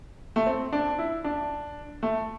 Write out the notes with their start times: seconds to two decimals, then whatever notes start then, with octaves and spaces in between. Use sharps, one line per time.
0.36 A3
0.46 C4
0.73 D4
0.99 E4
1.24 D4
2.03 A3